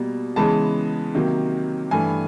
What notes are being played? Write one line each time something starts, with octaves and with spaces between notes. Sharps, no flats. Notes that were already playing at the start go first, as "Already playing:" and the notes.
Already playing: B2 G3 A#3
C#3 E3 G#3 B3 A5
C3 D#3 F#3 A#3
G2 E3 A3 G#5